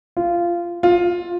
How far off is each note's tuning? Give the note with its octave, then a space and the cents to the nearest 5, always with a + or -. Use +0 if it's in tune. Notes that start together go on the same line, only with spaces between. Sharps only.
F4 -15
F4 +10